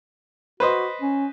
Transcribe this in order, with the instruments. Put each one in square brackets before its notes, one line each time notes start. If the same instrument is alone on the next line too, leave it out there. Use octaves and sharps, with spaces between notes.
[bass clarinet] F#4 [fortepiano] B4 C5 D#5
[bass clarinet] C#4